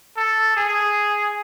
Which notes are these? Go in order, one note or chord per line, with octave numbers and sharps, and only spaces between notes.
A4
G#4